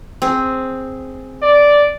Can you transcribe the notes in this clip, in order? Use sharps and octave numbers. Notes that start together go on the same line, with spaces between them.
C4 G#4
D5